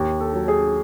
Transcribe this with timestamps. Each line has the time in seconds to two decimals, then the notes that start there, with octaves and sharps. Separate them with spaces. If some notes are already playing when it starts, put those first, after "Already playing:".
Already playing: D#2
0.20 A4
0.34 F#3
0.48 G#4